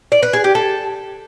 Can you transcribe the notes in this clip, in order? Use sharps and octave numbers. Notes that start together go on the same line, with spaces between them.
D5
B4
G#4
G4
A4